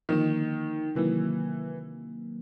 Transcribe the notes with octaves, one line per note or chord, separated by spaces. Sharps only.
D3 D#3 F3 A#3 D#4
C3 D#3 E3 F#3 A#3